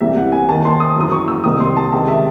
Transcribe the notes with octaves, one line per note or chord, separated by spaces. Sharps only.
C2 C3 E3 E5
F#5
G#5
D#2 D#3 A5
C6
D#6
F#2 E3 D#6
C#6
E6
C2 C3 D#3 D#6
C6
A5
C#2 C3 D#3 A5
E5